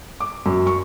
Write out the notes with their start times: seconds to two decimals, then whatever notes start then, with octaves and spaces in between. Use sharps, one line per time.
0.20 D6
0.46 F#2
0.67 C#6